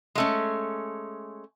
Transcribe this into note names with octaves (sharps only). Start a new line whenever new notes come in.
G#3 A3 C#4